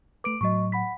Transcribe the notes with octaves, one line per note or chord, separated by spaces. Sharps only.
A3 B4 D6 D7
A2 F#3 D#5 C#6
F#5 B5 B6